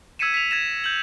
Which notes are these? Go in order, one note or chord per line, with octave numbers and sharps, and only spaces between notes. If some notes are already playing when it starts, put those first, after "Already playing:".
E6 G#6 B6 C#7 D#7 E7
B6 F7
G#6 A#6 E7
G6 F#7